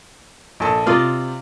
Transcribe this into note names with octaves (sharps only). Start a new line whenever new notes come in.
A#1 A4
C3 F4 D5 D#5